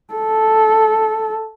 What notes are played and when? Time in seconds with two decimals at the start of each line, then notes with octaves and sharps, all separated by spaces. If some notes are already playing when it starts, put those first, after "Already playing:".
0.14 A4